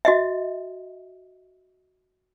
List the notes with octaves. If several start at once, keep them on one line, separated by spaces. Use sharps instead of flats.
F#4 D#5 E5